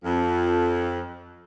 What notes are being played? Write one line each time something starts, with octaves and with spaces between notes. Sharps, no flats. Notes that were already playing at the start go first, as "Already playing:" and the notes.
F2